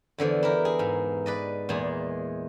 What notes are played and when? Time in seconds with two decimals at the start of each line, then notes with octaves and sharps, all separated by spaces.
0.18 E2 D3 E3 F3
0.43 E4 G4 A#4
0.65 G#4
0.79 G#2
1.26 B4 D5 D#5
1.69 E2 A#2 G#3 G#4